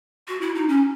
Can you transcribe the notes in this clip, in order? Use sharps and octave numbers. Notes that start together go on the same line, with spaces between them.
F#4
E4
D#4
C#4